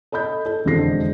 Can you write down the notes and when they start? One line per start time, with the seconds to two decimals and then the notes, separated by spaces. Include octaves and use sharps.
0.12 A4 D#5 B5 G6
0.46 A4
0.65 E1 F2 D3 G#3 A#6 C7